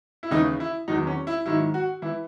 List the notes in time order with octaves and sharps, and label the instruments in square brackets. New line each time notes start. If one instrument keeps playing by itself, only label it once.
[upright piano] E4
D#2 C#3 E3 D#4
E4
E2 D#3 F#3 D#4
C#4
E4
G#2 D#3 F#3 E4
F#4
E3 E4